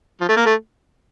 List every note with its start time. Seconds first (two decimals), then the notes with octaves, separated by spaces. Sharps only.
0.20 F3
0.29 A3
0.37 A#3
0.46 A3